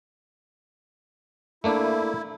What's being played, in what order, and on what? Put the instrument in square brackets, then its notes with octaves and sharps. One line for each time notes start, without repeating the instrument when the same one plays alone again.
[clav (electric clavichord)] A3 A#3 D4 [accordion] E4